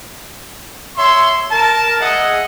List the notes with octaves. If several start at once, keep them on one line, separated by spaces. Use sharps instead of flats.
C#5 E5 C6
A#4 A5
G#3 G#4 D#5 E5 F#5